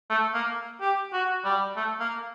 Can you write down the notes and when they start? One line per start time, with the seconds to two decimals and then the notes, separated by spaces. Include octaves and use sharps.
0.10 A3
0.34 A#3
0.81 G4
1.13 F#4
1.44 G3
1.76 A3
2.00 A#3